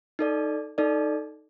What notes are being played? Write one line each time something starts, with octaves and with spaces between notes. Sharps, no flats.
D#4 A4 D5
D#4 A4 D5